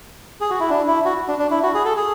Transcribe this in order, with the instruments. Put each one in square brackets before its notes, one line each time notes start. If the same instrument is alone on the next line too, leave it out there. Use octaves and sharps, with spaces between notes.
[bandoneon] G#4
F#4
E4
D4
E4
F#4
D4
D4
E4
F#4
G#4
A4
G#4